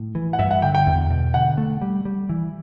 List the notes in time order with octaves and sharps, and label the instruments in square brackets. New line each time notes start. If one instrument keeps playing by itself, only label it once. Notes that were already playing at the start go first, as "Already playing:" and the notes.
Already playing: [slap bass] A2
E3
[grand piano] F#5
[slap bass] G2 [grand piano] E5
[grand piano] F#5
[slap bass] D3 [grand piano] G5
[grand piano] G5
[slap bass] E2
B2
[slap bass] D3 [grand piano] F#5
[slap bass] A3
G3
G3
E3